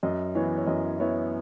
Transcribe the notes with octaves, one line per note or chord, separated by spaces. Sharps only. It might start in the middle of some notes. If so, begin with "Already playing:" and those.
F#2 D#5
E3 B3 E4 C#5
C#5
F#2 D#5
E3 B3 E4 C#5